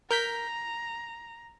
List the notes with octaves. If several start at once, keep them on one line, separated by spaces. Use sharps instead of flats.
A#4 A#5 G6 B6